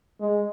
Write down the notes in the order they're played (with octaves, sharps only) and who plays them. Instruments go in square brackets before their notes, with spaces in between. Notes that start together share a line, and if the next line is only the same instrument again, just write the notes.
[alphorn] G#3